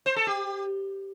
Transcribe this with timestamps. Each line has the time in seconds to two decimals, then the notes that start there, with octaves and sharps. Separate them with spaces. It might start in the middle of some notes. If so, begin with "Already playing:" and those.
0.06 C5
0.16 A4
0.27 G4